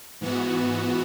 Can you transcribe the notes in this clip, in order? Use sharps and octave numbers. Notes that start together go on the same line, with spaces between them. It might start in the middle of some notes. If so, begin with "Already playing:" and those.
G#2 E3 B3 F#4